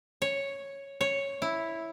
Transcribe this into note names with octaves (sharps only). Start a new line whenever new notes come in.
C#5
C#5
E4